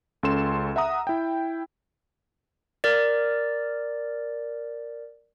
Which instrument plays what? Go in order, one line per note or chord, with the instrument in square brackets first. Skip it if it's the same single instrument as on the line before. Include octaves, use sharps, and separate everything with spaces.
[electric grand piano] C#2 C#4 A4 C6 E7
E5 F#5 A#5 D#6
E4 G5
[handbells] A#4 D5